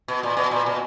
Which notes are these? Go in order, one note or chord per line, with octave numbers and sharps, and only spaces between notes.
B2
A#2
B2
A#2
B2